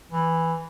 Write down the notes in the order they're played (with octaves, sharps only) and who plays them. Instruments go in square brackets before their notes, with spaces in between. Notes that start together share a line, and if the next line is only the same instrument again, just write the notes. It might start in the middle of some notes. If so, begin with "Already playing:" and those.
[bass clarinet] E3